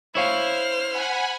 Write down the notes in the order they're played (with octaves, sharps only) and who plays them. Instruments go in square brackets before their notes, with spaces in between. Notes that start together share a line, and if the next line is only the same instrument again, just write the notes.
[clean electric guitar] E4 C#5 F5 [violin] C5 F6
[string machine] F#5 G#5 B5